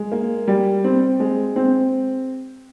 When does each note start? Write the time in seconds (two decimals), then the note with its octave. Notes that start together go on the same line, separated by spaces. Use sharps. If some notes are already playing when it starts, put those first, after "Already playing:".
Already playing: G#3
0.12 A#3
0.47 G3
0.84 C4
1.20 G#3
1.56 C4